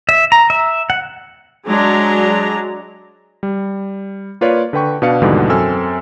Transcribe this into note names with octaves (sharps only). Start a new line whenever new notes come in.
E5
A#5
E5
F#5
F#3 G#3 D4 A#5
G3
A#3 F4 B4 C#5 D5 F5
D3 B4 G5 C#6
B2 D4 B4 F5 C#7
D#2 G#2 B2 D3 E3 G3
F#2 C4 A4 G#5 E6 F6